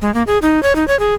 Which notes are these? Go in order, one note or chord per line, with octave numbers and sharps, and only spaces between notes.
G#3
A#3
G#4
D#4
C#5
D#4
C#5
G#4